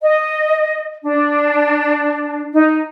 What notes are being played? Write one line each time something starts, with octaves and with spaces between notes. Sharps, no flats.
D#5
D4
D#4